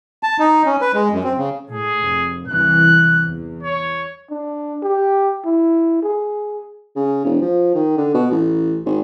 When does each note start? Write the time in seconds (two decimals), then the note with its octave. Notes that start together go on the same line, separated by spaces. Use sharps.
0.23 A5
0.39 D#4
0.66 C#4
0.81 B4
0.94 G#3
1.12 F#2
1.24 C4
1.37 C#3
1.67 A2 G#4
2.02 F1
2.48 C2 E3 F#6
3.25 E2
3.63 C#5
4.30 D4
4.83 G4
5.45 E4
6.02 G#4
6.96 C#3
7.25 E1
7.41 F3
7.75 D#3
7.97 D3
8.14 B2
8.31 A1
8.86 G#1